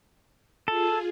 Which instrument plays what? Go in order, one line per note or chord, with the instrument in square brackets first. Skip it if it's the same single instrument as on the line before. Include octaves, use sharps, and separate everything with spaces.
[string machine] F4 G#4 [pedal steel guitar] A4